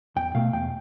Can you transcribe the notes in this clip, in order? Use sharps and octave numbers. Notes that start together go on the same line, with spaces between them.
E2 G5
B2 A3 F5
E2 G5